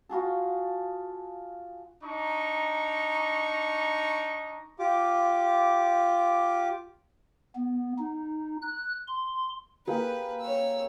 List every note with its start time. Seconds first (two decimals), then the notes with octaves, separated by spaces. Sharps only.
0.09 F4 F#4 G#4 A4
2.03 D4 D#4 A#5 C#6
4.79 F4 G4 D6
7.55 B3
7.98 D#4
8.61 F#6
9.07 C6
9.87 A#3 G4 G#4 B4
10.41 C#5 E6